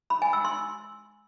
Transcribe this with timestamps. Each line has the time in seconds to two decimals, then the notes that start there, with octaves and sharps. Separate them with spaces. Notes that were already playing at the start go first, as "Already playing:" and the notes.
0.10 B5
0.22 G#5
0.33 E6
0.45 C6